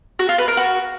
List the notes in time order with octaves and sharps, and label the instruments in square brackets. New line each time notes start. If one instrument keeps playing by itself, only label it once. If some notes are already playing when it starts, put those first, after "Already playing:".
[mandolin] F#4
F4
B4
A#4
F#4